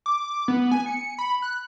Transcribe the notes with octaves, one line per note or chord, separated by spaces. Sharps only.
D6
B3
G#5
C#7
B5
F#6